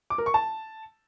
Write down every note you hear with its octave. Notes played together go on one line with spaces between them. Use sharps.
D6
A#4
C#6
A5